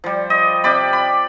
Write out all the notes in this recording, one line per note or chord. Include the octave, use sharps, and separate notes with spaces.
F3 G3
D#5
C3 G4 D5 B5
B5